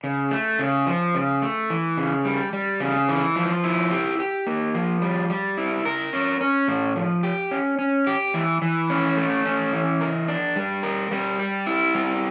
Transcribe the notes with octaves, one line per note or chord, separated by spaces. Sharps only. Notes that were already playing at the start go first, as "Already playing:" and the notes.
C#3
A3
C#3
F3
C#3
A3
E3
C#3
G3
G3
C#3
E3
F3
E4
G4
G4
A#3
F3
G3
G3
E4
A#4
C#4
C#4
A2
F3
G4
C#4
C#4
G4
E3
E3
C#4
A3
C#4
E3
A#4
D4
G3
A#4
G3
G4
E4
G3